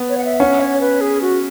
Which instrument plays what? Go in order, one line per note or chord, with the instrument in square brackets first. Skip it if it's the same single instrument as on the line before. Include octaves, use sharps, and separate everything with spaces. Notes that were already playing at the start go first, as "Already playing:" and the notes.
Already playing: [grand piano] B3
[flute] C#5
F#5
E5
[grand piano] C#4 [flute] F#5
[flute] C#5
B4
G#4
F#4